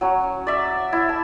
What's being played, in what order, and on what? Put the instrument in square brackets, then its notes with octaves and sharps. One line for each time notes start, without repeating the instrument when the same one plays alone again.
[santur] F#3 C#4
D5 E5
E4
A5